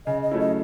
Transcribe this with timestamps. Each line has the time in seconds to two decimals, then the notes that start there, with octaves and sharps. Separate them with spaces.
0.06 C#3 D#5
0.23 D#5
0.32 F#3 A3 C#4 E4
0.40 D#5